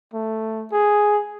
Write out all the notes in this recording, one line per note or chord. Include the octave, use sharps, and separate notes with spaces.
A3
G#4